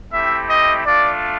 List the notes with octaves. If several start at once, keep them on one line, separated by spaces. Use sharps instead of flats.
A3 C4 E4 G4 E5
D#5
A3 D4 F4 D5